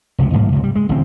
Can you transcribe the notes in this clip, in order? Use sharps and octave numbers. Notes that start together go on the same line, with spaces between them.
F1 C#2 C3
A1 G#2 G3 A#3
C#2 C3
G3
G#3
A1 D3 C4